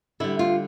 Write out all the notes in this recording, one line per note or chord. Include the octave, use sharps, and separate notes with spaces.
D3 G3 E4
F4